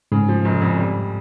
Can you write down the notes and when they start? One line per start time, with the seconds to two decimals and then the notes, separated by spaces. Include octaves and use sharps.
0.12 G#2 C#3
0.28 F3
0.45 F1
0.61 F2
0.79 G3